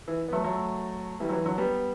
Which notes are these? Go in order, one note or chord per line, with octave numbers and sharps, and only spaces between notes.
E3
B3
F#3 A3
F#3 A3
E3 G3
F#3
E3
D3 F#3
G3 B3